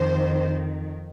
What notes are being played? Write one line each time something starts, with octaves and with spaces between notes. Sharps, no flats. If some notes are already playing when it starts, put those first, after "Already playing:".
Already playing: F2 D#3 C5